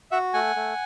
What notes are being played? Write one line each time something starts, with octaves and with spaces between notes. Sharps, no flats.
F#4 E5 F#5
A3 F#5 G#5
A3